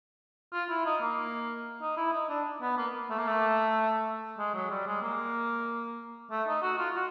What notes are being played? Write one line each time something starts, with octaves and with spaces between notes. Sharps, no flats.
F4
E4
D#4
A#3
D#4
E4
D#4
D4
B3
A#3
A3
A#3
A3
G#3
F#3
G3
G#3
A#3
A3
D#4
F#4
F4
F#4